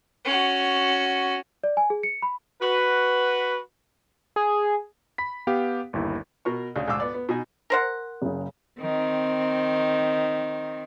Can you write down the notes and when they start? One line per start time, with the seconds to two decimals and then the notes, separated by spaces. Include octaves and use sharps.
0.25 C#4 F#4
1.64 D5
1.77 G#5
1.90 G#4
2.03 C#7
2.22 B5
2.62 F#4 B4
4.36 G#4
5.18 B5 B6
5.47 B3 G4 F5
5.93 G1 D#2 E4
6.45 B2 A#4 C#6
6.76 D2 C#3
6.88 D2 G#2 F5 D6 E6
7.00 B3 D5
7.14 B3
7.29 B2 D#4 G#5
7.70 A#4 C5 F#5
8.22 F#1 C#3
8.80 D#3 C4